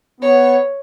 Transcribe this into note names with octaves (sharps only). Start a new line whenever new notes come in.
B3 C#5